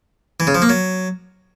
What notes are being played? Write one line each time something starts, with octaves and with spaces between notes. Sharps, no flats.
E3
C#3
F3
A#3
F#3